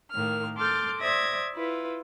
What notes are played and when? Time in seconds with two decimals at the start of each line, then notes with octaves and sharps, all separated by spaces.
0.12 A2 D#3 A#3 F6
0.57 A4 C6 D6 F6 G6 A6
1.00 C5 D5 E5 D#6 G#6 A#6
1.53 E4 F4 B4